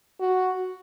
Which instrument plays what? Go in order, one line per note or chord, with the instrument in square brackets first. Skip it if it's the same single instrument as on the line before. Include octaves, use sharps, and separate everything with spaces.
[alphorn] F#4